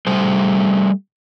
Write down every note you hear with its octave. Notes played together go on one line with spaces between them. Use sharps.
G3 A3 C5